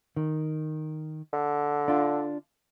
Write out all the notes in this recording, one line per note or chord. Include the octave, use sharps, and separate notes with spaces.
D#3
D3
D4 F4